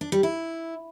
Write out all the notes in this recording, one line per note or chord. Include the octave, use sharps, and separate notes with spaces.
D4
G3
E4